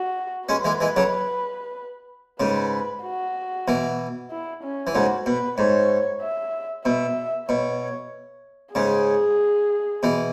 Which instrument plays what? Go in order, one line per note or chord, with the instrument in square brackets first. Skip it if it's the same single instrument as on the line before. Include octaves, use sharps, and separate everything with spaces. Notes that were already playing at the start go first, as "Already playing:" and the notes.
Already playing: [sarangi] F#4
[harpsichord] G#3 C#4 [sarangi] B4
[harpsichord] E3 G#3
E3 G#3
C#3 F#3
[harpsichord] G#2 C#3 [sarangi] B4
[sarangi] F#4
[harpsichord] B2 E3
[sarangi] E4
C#4
[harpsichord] E3
[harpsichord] G#2 C#3 [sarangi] F#4
[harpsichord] B2 [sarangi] B4
[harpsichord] G#2 [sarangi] C#5
[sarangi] E5
[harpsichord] B2 [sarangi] E5
[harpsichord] B2 [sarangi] C#5
[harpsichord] G#2 C#3 [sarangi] G#4
[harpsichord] B2 E3